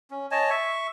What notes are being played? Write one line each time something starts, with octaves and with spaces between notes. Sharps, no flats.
C#4
C#5 D#5 G#5 A5
E5 C#6